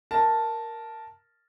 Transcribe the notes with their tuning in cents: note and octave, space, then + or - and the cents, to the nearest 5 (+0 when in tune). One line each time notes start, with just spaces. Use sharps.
A#4 +0 A5 +0